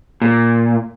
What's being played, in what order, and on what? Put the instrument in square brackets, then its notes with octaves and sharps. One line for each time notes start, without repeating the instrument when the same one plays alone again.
[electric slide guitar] A#2